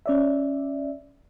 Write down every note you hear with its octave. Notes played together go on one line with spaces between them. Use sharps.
C#4 D5 E5